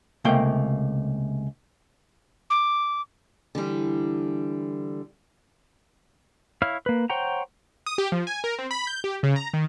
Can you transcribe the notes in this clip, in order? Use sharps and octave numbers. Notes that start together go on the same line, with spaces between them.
C#2 C3 A3 A#3 F5 G5
D6
D3 E3 G3
E4 C#5 F5 F6
A#3 B4
C5 C#5 F#5 G5 A#5
D#6
G4
F3
G#5
A#4
C4
B5
G6
G4
C#3
A#5
D#3